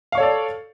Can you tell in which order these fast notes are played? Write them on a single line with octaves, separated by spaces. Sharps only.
F5 C#6 C#5 A4 D5